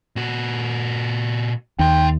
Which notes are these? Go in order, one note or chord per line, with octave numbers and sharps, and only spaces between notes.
A#2 F#4
D#2 D#4 G5 C6